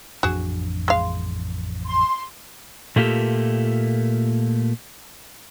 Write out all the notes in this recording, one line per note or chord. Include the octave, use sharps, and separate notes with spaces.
A1 F2 D4 F#4 G#4
G#3 F5
C6
A#2 A3 A#3 F4 G4 A4